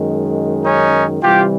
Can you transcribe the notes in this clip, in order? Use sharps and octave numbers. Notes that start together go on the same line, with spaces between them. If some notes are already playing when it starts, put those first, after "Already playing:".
Already playing: F#2 D#3 G#3
C#4 D#4
C3 E3 G3 F4 G4